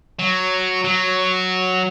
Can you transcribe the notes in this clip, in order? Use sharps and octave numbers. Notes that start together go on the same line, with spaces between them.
F#3
F#3